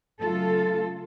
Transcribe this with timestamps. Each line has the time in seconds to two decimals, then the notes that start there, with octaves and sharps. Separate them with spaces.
0.21 C#3 F#3 A3 F4 A4